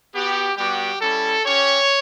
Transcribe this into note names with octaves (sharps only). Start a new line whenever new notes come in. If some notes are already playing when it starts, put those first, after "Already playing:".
B3 F#4 G4
G3 B3 F#4 G4
G3 C#4 E4 A4
C#4 G4 C#5